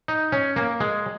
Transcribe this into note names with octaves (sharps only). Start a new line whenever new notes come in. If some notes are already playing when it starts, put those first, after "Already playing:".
D#4
C#4
A#3
G#3